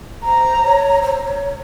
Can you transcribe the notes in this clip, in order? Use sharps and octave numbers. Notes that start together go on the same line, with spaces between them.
C5 A#5
C#5
C5
C#5